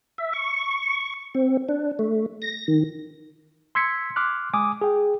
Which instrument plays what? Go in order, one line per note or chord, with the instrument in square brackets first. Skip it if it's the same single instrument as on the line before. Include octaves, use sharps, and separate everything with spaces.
[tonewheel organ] E5
C#6
C4
D4
A3
A#6
D#3
[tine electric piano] C6 E6 G#6 B6 C#7
C6 D6 F6 F#6
G#3 G#5 D6 D#6
G#4 G5